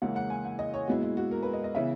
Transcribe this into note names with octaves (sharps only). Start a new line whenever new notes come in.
C#2 C#3 E3 A#3 E4 F#5
F#5
G#5
F#5
D#5
C#5
A#2 G#3 B3 E4 F#4
E4
F#4
A#4
B4
D#5
D#5
C#3 E3 B3 E5